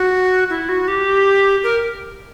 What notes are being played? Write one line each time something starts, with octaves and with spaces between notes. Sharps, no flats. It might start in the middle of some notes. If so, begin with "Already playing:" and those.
Already playing: F#4
E4
F#4
G4
A#4